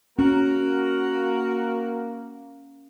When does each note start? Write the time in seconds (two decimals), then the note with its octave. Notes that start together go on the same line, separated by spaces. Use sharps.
0.19 A#3 C#4 F#4 A#4